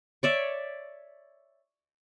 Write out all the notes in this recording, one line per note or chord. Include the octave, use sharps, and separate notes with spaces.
C#5 D5 E5